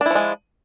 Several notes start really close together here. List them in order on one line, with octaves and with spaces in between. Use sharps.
D4 E4 F3 G#3